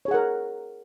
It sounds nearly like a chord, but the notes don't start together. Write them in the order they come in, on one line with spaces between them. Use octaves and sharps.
C#5 G#4 F#5 A#4